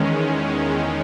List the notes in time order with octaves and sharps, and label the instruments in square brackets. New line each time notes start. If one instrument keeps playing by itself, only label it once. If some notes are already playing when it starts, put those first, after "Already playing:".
Already playing: [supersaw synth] E2 D#3 G#3 C#4